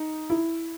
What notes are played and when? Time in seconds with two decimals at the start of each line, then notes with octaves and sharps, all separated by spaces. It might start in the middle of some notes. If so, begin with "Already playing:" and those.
Already playing: D#4
0.30 E4